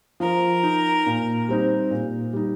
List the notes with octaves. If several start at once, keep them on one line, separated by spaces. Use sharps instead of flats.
F3 A#4
D#4
A#2
G3 C4 D#4
A#2
G3 D#4